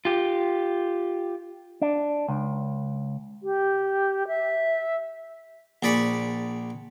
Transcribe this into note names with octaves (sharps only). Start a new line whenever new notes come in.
F4 G4
D4
C#2
G4
E5
A#1 G#4 D5 B5 C#6